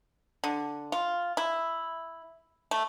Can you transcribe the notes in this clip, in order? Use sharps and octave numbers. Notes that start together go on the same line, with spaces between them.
D3
F4
E4
A3